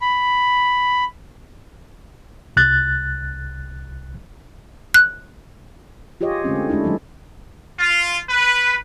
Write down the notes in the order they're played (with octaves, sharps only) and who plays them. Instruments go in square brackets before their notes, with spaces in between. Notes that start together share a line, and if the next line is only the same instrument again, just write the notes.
[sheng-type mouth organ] B5
[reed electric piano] C2 F#6 A6
[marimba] F#6
[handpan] F4 G4 G#4 C#5 D#5
D3 G#3 A3 C4 C#4
A3
G#3 A3 D4 E4
D#3 F#3 G#3 A3
[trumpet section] F4
B4